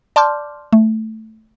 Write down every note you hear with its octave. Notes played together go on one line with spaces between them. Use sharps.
D5 A5 C6 D6 F6 G6
A3